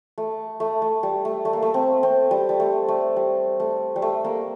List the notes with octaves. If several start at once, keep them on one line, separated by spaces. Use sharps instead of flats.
A3
A3
A3
G3
A3
A3
A#3
A3
C4
C4
G3
G3
A3
A3
G3
A3
G3
A3
A#3